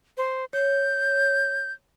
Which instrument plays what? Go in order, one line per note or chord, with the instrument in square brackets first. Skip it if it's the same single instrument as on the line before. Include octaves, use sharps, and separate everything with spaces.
[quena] C5
[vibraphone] C#5 [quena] G6